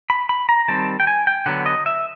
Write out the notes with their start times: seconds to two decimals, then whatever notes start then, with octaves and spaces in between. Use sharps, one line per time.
0.10 B5
0.29 B5
0.49 A#5
0.68 D#3 G3 C4 A5
1.00 G5
1.07 G#5
1.27 G5
1.46 D3 F#3 B3 F#5
1.66 D#5
1.86 E5